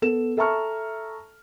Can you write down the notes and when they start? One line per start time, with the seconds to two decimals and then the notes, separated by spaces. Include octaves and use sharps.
0.02 B3 A4 E7
0.37 A4 E5 A5 A#5 C#6 F6